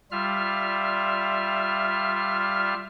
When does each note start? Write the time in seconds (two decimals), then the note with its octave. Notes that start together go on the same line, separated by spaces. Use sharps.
0.11 G3 F4 E5 F6